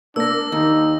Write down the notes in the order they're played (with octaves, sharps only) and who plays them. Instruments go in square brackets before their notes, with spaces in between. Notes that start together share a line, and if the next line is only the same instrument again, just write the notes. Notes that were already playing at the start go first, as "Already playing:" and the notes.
[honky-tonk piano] A#3 [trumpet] D4 [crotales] E6 A#6
[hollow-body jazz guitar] D#2 [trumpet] D#4